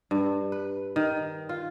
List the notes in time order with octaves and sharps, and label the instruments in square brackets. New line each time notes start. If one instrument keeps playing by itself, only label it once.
[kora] G2
B4
D#3
F4